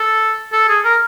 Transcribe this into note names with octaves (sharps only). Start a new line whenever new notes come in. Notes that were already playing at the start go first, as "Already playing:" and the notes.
Already playing: A4
A4
G#4
A#4